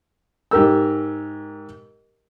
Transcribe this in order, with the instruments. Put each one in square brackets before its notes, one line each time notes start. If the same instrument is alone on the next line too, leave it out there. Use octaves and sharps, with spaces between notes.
[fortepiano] G#2 G4 A#4 E6